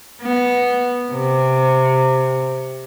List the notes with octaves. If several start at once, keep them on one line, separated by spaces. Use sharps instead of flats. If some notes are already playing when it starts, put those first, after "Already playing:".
B3
C3